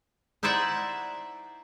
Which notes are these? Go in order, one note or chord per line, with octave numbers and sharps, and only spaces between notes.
D#4 E4 C5 D5 E5 F#5